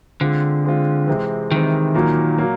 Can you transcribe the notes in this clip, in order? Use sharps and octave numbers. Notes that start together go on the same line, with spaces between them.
D3 G#3 C4 F4
G#3 C4 F4
C3 E3 G#3 C4
C3 D#3 E3 G#3 C4
A#2 F#3 A#3
A#2 F#3 A#3